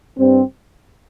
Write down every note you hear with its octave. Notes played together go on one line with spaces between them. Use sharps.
G2 G3 C4